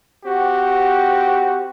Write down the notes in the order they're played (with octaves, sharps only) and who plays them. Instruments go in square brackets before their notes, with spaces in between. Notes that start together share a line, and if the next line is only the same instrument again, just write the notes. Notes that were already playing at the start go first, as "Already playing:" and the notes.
[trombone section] C4 F#4 G4